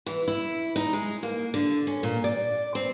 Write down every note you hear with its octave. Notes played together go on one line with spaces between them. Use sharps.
E3
E4
D#4
G#3
A#3
D3
C#4
A#2
D5
C4